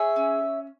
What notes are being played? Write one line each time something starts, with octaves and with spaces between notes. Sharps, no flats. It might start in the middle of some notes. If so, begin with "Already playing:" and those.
Already playing: G#4 C#5 E5
C#4